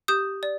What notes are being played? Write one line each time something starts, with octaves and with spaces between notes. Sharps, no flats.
G4 D#6 G6
D5